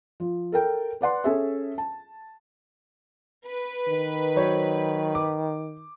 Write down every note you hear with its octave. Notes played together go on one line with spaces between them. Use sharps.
F3
A4 A#4 G5
B4 D5 F#5 C6
C#4 G#4 A4 E5
A5
B4
D#3
F#3 C5 C#5
D6